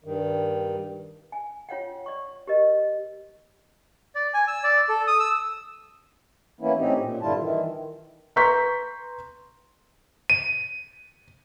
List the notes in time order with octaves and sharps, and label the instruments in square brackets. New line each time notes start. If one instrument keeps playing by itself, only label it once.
[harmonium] G2 D#3
[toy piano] G#5
F4 C#5 F#5 G5
D5 C#6
G4 A#4 D#5
[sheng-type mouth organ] D5
G#5
E6
D5
A4
D#6
E6
[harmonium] E3 A#3 B3 C#4 E4
A2 C4 C#4 D#4 G4
A#2
G2 D3 G3 E4 F4 A5
D#3 E3
[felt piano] B4 A#5 C6 C#6 G6 B6
[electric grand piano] D#7